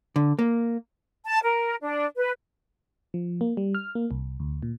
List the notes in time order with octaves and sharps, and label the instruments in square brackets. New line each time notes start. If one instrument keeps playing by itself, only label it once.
[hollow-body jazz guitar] D3
A#3
[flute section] A5
A#4
D4
B4
[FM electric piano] F3
A#3
G3
F6
A#3
C2
D2
A#2